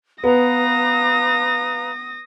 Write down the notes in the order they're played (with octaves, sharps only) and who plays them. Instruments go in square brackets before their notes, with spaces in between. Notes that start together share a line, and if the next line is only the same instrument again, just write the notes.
[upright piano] B3 [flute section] B4 F5 A#5 [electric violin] D#6 A#6